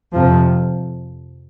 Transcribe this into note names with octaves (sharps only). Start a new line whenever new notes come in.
F2 C3 F3